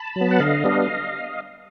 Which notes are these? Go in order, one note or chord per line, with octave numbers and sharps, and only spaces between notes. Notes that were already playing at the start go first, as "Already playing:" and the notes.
Already playing: A5 B5
F#3
B3
F#5
D3 D#5 F5
G3 B3 D4